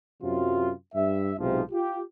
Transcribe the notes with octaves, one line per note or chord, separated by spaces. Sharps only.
F#2 C3 F#3 F4
G2 E5
B1 G#2 C3 F3
F4 G4